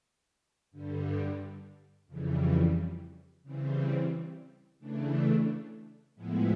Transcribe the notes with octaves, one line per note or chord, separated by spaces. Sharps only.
G2 D3 G3
F2 C#3 E3 G3
C#3 E3 G3 C4
C#3 E3 A3 D4
A2 F3 G#3 B3 E4